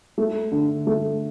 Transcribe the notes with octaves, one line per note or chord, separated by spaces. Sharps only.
A3
D3
A3